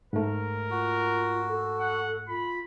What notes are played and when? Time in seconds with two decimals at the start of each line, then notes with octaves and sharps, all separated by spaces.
0.13 G#2 A3 A#4
0.70 F4 F#4
1.48 A4
1.80 F#5
2.29 F4 B5